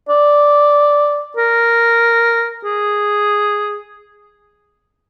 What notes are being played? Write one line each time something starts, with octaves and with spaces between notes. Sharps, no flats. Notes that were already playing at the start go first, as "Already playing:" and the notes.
D5
A#4
G#4